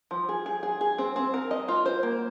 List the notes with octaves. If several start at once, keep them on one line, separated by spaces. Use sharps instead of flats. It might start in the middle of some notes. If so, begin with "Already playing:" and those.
F3
G#4
G#4
G#4
G#4
C4
C4
A#4
D#5
F4
C5
A#3